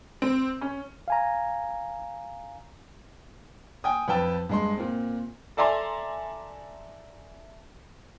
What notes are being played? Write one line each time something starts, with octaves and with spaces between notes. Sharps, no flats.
C4
C#4
F5 G#5 A#5
G5 G#5 D#6
F2 B4 G5 A5 E6
G2 G#3 C6
A#2 C4
A4 D5 E5 G#5 A#5 C6